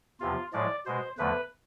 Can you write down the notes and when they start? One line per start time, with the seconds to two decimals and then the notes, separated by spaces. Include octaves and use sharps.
0.20 E2 C3 F3 F4
0.53 A2 F3 G#3 D5
0.86 B2 G#3 C5
1.18 E2 D3 F3 A3 B4